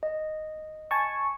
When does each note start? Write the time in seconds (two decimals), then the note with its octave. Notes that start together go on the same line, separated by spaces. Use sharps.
0.03 D#5
0.91 G#5 A5 C#6